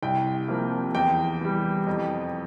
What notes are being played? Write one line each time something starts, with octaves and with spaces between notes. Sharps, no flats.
C2 G5
C3 F3 A#3
E2 G5
E3 G3
F2